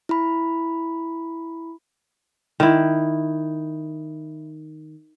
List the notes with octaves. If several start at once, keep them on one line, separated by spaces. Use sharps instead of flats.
E4 B5
D#3 E4